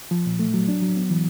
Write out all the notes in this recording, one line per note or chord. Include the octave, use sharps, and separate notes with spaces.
F3
A#2
A3
F#3
D4
F#3
B3
E3